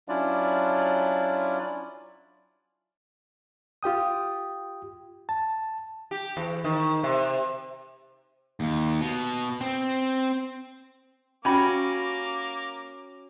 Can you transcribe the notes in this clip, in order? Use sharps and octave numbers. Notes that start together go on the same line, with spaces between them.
F#3 C#4 D4 E4 F4 D5
F4 G4 G5 D#6
A5
G4
E2
D#3
C3
D#2
B2
C4
A#3 C#4 F#4 G4 B5 D6